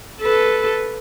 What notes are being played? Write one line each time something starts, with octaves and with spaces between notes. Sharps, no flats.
A4 B4